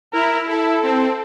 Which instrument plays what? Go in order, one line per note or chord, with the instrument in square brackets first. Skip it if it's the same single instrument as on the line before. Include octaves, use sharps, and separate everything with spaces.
[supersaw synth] E4 [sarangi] A#4
[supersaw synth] E4 [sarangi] A4
[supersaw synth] C4